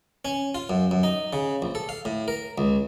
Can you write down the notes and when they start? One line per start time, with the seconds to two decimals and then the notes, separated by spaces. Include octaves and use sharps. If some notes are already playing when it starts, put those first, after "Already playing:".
0.25 C#4
0.55 F4
0.70 F#2
0.91 F#2
1.03 D#4
1.33 C#3
1.62 A#1
1.75 A4
1.89 F5
2.05 A2
2.28 A#4
2.58 C#2